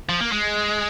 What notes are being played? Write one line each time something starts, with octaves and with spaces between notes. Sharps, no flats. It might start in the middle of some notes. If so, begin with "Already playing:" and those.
F3
A#3
G#3